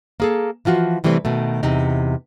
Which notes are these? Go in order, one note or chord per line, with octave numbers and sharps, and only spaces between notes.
A#3 G#4 A4
E3 F3 F4 F#4
C3 E3 G3 A3 C4
B2 D#3 A3
E2 C3 D#4